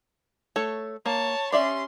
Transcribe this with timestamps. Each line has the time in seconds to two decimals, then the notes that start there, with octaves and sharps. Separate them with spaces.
0.56 A3 A4 C#5
1.06 A#3 C#5 A5
1.52 C#4 G4 D5 E5 C6